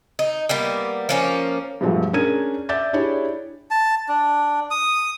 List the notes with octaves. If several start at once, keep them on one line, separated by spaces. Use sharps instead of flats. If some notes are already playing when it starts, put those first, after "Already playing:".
D#4
G3 A#3 B3
F3 A#3 C#4
G2 B2 F3 F#3 G#3 A3
C#4 D4 G#4 A#4 G#6 D#7
D5 E5 D6 G6 A6
D4 E4 G4 G#4 C#5 D5
A5
D4
D#6